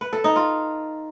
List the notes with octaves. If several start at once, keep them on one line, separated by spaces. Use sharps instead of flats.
B4
A4
D#4
F4